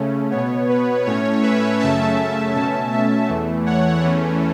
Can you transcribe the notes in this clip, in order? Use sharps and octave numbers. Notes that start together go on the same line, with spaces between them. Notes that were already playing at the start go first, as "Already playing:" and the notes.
Already playing: C#3 A3 C#4
B2 B3 C#5
B4
A2 A3 C#4 C#5
B4 E5
F#2 C#3 A3 C#4 E5 A5
B2 A3 C#4 E5 A5
E5 A5
E2 E3 A3
C#5 F#5
E2 E3 A3 C#4